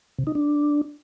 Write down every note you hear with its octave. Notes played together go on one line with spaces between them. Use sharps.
C3
D#4
D4